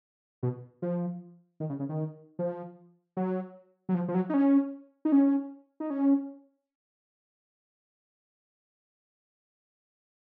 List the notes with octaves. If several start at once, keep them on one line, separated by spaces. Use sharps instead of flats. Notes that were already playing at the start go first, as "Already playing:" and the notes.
B2
F3
D#3
C#3
C#3
D#3
F3
F#3
F#3
F3
F3
F#3
D#4
C#4
D#4
C#4
D#4
C#4